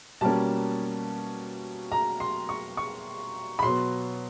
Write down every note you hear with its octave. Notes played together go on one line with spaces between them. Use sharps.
B2 G3 A#3 C#4 A5
A#5
C6
C#6
C#6
B5
B2 F#3 B3 C6